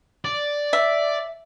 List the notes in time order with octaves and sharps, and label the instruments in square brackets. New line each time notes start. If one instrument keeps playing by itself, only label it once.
[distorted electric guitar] D5
[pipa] E5